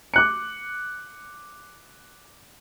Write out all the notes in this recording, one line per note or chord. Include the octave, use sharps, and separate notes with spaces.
D6 F#6 C#7